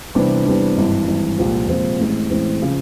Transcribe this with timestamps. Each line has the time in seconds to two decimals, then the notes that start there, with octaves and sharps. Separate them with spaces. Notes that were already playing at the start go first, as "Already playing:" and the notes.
0.15 C3 E3 G3 B3 D4
0.46 C3 E3 G3 B3 D4
0.76 G#1 G2 E3
1.08 G#1 G2 E3
1.38 C2 A#2 F3 G#3 C4
1.68 C2 A#2 F3 G#3 C4
1.99 A1 A2 E3 G#3 C4
2.30 A1 A2 E3 G#3 C4
2.62 C#3 F3